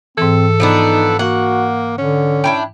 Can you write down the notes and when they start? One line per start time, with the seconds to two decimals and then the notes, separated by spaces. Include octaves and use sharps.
0.18 G#2 E3 C4 A4
0.60 F3 B3 D4 D#4
1.19 A#3 F#4 F#5
1.98 D3 C#4
2.44 D4 E4 G5